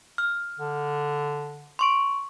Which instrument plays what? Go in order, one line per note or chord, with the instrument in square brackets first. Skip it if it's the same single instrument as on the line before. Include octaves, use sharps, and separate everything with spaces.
[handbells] F6
[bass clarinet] D3
[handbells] C6 C#6 D7